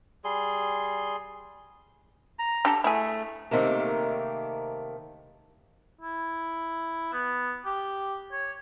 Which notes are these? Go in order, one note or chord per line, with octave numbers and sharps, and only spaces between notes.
G3 G#4 C6
A#5
D4 G4 A4
A3 E4 G#4
C3 D#3 A3 A#3
E4
B3
G4
C#5